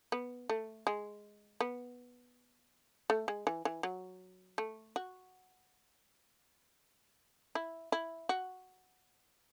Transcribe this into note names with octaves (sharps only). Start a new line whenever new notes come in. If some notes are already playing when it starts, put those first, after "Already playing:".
B3
A3
G#3
B3
A3
G#3
E3
E3
F#3
A3
F#4
E4
E4
F#4